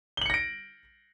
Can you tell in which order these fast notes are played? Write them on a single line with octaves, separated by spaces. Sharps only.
G7 F#7 C#7 A#6 D7